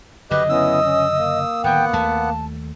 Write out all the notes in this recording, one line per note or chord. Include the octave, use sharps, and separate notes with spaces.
F#1 D3 F#3 G4 B4 D#5
B3 C#4 E4 D#6 E6
C#4
A#3
D1 D#3 B3 F#5 G5
D#2 A3 A5